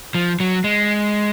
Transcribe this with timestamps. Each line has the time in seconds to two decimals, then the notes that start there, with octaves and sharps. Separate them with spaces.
0.15 F3
0.40 F#3
0.64 G#3